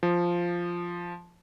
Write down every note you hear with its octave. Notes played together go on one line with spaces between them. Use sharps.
F3